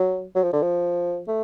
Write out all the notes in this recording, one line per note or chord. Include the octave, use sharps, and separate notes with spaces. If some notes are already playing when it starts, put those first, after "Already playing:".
Already playing: F#3
F#3
F3
D3
F3
A3